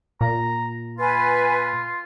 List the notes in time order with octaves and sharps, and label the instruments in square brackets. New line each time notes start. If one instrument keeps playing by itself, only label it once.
[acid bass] A#2 [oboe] A#5
[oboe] F4 [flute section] B4 G#5